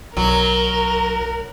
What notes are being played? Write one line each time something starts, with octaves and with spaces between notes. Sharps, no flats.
B1 F#3 A#4